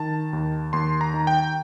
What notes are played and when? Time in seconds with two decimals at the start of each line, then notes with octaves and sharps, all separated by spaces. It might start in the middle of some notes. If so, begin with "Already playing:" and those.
Already playing: D#3 A5
0.33 D#2
0.73 D#2 C6
1.01 A#5
1.14 D#3
1.27 G5